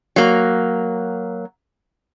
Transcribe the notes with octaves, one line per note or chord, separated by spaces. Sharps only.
F#3 A#3